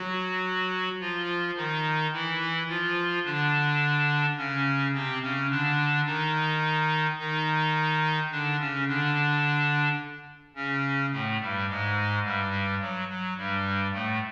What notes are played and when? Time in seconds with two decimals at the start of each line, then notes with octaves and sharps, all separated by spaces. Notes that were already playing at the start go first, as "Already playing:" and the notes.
Already playing: F#3 F#4
1.00 F3 F4
1.56 D#3 D#4
2.12 E3 E4
2.68 F3 F4
3.24 D3 D4
4.37 C#3 C#4
4.93 C3 C4
5.22 C#3 C#4
5.50 D3 D4
6.05 D#3 D#4
7.19 D#3 D#4
8.31 D3 D4
8.59 C#3 C#4
8.87 D3 D4
10.55 C#3 C#4
11.12 A2 A3
11.40 G2 G3
11.68 G#2 G#3
12.24 G2 G3
12.81 F#3
13.08 F#3
13.37 G2 G3
13.93 A2 A3